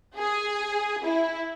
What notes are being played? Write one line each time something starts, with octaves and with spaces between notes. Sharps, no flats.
G#4
E4